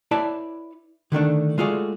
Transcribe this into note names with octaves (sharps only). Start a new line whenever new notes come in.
E4 B4 C#5 D5 E5 A5
D3 D#3 A3 D4
G#3 A3 F4 F#4 G#4 D5